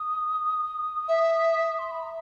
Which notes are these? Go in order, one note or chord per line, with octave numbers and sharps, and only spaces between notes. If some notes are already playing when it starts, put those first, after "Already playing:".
Already playing: D#6
E5
C6
B5
A#5